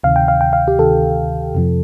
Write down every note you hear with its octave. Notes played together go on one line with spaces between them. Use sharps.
D2 C3 D#3 F5
G5
F5
G5
F5
G4
D2 C3 D#3 A4
F2 C3 F3